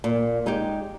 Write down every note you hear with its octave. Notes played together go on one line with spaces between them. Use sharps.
A#2
G#3 D#4 G4